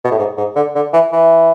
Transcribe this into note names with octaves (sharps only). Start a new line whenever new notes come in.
B2
A2
G#2
G#2
D3
D3
E3
E3